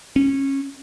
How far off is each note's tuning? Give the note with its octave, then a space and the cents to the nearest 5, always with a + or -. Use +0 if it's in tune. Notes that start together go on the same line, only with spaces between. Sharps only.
C#4 -20